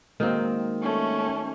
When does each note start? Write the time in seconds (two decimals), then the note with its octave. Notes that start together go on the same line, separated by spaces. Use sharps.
0.20 D#3 F#3 G#3 A#3 C4
0.82 A3 C#4